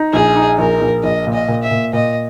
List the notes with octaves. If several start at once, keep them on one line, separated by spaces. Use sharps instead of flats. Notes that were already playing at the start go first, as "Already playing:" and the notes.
Already playing: D#4
A#1 G#4
D#4
A#1 A#4
A#1
A#1 D#5
A#2
D#5
A#2
E5
A#2
A#2 D#5